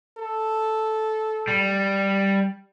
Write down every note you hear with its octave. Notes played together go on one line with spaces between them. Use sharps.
A4
G3